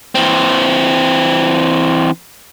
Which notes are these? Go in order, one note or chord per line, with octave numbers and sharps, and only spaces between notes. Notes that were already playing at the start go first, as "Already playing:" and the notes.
E3 C4